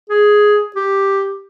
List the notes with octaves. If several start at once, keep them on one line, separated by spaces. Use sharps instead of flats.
G#4
G4